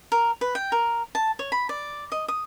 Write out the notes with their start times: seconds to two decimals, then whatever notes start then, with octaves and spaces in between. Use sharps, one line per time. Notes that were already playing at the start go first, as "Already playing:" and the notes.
0.12 A#4
0.41 B4
0.55 G5
0.72 A#4
1.15 A5
1.39 C#5
1.52 B5
1.69 D5
2.12 D#5
2.28 D#6